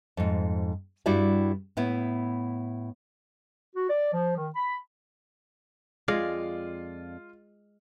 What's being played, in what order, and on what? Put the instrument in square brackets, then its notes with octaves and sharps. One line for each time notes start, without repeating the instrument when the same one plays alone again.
[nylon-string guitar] F2 G#2
G2 G3 E4 F#4 D5 E5
A2 B3 E4
[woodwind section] F#4
D5
F3
D#3
B5
[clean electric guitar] F2 D5 F5 [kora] G#3 [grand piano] F4